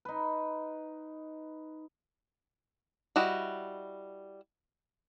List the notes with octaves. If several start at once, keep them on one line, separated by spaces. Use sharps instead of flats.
D#4 B4
G3 E4 F#4 D#5